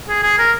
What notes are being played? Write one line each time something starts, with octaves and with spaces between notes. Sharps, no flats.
G#4
G#4
A#4